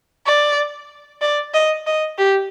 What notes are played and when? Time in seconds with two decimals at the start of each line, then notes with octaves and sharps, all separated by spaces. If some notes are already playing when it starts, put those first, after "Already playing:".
0.27 D5
1.22 D5
1.54 D#5
1.87 D#5
2.18 G4